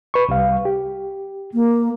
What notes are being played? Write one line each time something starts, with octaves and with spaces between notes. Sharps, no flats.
B4 C#6
C2 G3 F5
G4
A#3